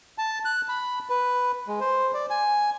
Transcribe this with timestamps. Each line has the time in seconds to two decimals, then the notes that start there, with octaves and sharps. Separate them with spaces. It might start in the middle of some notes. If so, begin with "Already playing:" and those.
0.18 A5
0.45 F#6
0.69 B5
1.10 B4
1.67 G#3
1.80 C5
2.14 D5
2.30 G#5